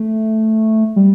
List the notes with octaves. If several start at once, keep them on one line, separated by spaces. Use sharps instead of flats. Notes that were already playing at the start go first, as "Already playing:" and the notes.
Already playing: A3
G3